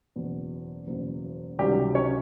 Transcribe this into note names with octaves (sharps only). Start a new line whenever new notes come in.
F#1 E2 B2
F#1 E2 B2
C#2 C3 D#3 F#3 G3 G4
C#4 C#5